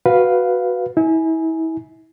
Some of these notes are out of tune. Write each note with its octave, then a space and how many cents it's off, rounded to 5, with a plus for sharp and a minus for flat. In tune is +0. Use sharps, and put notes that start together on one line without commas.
F#4 +0 B4 +0 F5 +0
E4 -35 G#5 +10